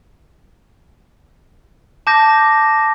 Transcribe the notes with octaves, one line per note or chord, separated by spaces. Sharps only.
A5 D6 G6 A#6